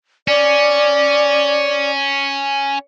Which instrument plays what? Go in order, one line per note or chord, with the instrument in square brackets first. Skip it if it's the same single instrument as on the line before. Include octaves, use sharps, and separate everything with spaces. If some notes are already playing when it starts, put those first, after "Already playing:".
[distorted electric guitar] C#4 [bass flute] D5